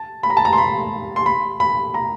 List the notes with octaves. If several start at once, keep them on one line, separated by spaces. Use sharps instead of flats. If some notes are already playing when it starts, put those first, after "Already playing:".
Already playing: A5
B5
A#5
A5
A#5
C6
B5
C6
B5
B5
A#5